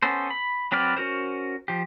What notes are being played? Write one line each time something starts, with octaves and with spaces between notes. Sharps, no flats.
B3 C#4 A4 C5
B5
F#3 C4 B4 D5 F6
C#4 F#4 A#4 C5
F3 G4